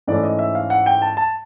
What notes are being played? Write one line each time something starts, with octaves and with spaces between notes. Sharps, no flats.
G#2 E3 A3 C#4 D5
D#5
E5
F5
F#5
G5
A5
A5